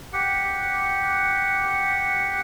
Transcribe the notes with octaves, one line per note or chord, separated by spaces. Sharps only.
G4 F#5